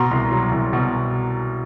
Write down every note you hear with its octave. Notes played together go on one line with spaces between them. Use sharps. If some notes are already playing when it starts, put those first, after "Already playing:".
Already playing: B2 A#5 C6
C2
F#3
C2
B2